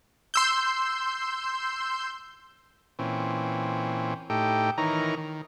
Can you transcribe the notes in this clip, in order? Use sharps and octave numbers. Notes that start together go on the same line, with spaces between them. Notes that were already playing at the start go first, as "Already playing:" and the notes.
C6 E6 G6
A#2 E3 C4 C#4
A2 D#4 G4 A4 G5
D#3 E3 D#4 A#4 C#5 A#5
D#3